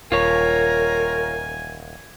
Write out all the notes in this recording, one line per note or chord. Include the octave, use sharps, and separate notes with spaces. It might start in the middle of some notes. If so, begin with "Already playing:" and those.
D#1 F4 A#4 C#5 G#5